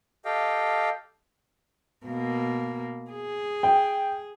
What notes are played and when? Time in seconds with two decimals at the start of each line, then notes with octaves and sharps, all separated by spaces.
0.25 G4 A4 D#5 F5 G5
2.06 B2 A#3
3.11 G#4
3.63 G5